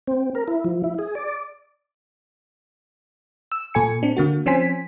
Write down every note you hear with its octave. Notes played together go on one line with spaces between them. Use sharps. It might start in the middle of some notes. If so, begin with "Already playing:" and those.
C4
A#4
E4
F3
E4
G#4
D5
E6
A#2 A4 G#5 C#7
C4 D4
D3 A#3 F#4
F3 C4 C#4 C5 G#5 B6